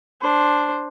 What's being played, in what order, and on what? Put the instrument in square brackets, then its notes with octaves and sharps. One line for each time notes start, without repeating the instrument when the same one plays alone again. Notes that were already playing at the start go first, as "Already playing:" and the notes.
[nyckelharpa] D4 C5